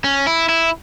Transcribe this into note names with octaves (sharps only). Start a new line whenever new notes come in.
C#4
E4
E4